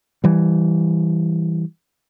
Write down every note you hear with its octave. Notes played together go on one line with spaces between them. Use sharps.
E3 G3